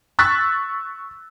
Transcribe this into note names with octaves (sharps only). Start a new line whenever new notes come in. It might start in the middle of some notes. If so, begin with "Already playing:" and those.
C#6 E6 F#6 A6 B6